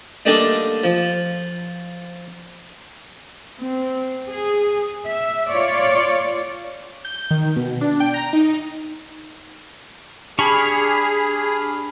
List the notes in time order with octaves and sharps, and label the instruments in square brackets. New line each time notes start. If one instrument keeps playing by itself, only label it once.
[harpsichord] D3 G3 A3 A#3 D4 D#4
F3
[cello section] C4
G#4
E5
F4 C#5 D5
[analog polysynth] G6
D#3
B2
D4
G5
A#5
D#4
[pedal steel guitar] D4 G4 C#6 [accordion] G#4 [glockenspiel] A5 [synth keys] B5 F6